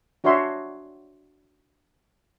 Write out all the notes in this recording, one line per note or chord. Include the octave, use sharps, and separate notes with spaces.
D4 F#4 C#5 E5 C6